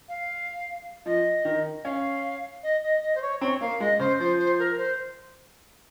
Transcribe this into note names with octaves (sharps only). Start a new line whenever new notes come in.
F5
F3 D#5
D#3
C#4 F5
D#5
D#5
D#5
C5
C#5
C4 C#5
A#3 F5
G#3 D#5
C#3 C5
F3 C5
C5
A#4
C5